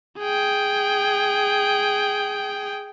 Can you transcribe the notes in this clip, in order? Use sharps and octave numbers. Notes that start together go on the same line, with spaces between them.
G#4 G5